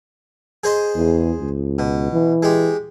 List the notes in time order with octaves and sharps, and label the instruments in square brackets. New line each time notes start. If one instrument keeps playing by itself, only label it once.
[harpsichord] G#4 C5 D#5
[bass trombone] E2
C#2
[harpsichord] B2
[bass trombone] E3
[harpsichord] G#3 G4